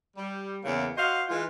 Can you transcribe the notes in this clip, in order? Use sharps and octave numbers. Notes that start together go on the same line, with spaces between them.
G3
E2 C#3 A#3 C#4
F#4 C5 D#5 F5
E3 G#3 F4